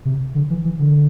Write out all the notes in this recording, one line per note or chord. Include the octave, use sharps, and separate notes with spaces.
C3
D3
E3
E3
D3